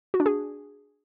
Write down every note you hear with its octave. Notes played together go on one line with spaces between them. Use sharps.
F#4
D4
G#4